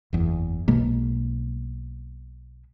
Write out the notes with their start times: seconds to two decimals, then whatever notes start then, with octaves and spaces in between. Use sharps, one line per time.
0.13 F#1 E2
0.68 B1 B2 G#3 A#3